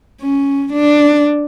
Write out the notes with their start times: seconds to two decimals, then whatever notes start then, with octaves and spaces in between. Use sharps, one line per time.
0.21 C#4
0.73 D4